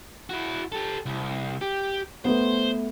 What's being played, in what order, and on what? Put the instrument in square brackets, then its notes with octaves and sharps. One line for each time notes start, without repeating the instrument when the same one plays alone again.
[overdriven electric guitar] E4 F#4
G4 A4
C2
G4
[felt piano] A3 B3 [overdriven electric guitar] C5